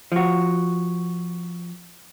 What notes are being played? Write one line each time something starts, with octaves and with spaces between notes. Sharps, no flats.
F3 F#4